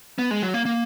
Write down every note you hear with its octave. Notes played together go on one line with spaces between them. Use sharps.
B3
G#3
F#3
A#3
A#3